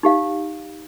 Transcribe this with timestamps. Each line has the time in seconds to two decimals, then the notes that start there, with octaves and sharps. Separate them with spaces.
0.03 D#4 G4 F5